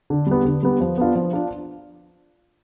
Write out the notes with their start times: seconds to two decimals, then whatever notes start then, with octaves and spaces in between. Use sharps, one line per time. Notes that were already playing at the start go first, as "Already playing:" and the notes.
0.10 D3
0.27 G3 B3
0.45 D3
0.63 G3 B3
0.80 F3
0.97 B3 D4 F4
1.15 F3
1.33 D4 F4